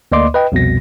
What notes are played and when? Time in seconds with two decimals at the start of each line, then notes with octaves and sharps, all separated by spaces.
0.12 D2 A#3 D5 D#5 C6 D6
0.34 B4 D#5 G5
0.52 C2 F2 B2 A#6